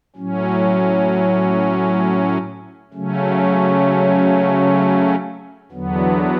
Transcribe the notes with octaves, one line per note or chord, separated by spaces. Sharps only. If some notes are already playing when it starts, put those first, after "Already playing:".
A2 F#3 C#4
C#3 F#3 A3 C#4
E2 D3 F#3 B3